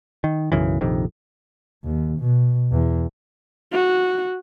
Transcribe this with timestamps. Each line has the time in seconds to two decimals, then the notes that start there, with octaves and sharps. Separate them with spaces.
0.24 D#3
0.52 B1 F#2 C#3 E3
0.81 A#1 F2 C3 D#3
1.84 D#2
2.20 B2
2.72 E2
3.73 F#4